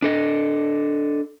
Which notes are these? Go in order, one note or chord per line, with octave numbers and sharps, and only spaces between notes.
D4 A4 D#5